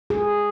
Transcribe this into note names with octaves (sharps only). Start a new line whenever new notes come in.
G#4